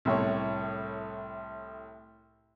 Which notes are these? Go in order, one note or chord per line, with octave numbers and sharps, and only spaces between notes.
C2 A2 C#5